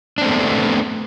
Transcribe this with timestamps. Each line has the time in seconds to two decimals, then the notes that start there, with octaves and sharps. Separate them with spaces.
0.18 D4
0.22 C4
0.26 A3
0.29 B3